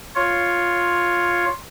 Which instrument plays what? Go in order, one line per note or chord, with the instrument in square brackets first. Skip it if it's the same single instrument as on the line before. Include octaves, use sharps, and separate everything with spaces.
[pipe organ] F4 C#5